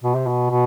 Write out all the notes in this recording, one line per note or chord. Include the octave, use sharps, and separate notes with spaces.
B2
C3
B2
B2